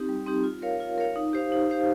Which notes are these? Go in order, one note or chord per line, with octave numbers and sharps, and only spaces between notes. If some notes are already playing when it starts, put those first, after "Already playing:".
Already playing: C4 D#4 G4
G3
C4 D#4 G4
F4
A#4 C#5 F5
F4
A#4 C#5 F5
D#4
G4 C5 F5
D#4
G4 C5 F5